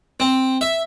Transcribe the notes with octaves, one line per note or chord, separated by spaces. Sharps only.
C4
E5